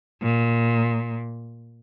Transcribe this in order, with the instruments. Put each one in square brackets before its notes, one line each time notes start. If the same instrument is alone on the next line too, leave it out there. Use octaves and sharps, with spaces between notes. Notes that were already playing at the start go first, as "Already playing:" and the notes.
[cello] A#2